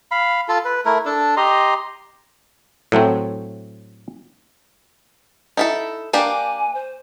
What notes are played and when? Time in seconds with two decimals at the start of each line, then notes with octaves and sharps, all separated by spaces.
0.11 F5 B5
0.48 F4 A4
0.65 B4
0.85 A3 E4 A#4
1.05 D4 A4
1.37 G4 D#5 A#5 C6
2.92 A2 F#3 A3 C4
5.57 D#4 E4 A4
6.13 A#3 D4 G4 G#5
6.74 C5